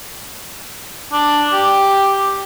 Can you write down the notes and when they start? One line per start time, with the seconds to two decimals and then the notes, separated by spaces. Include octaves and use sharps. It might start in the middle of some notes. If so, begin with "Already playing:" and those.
1.12 D4
1.53 G4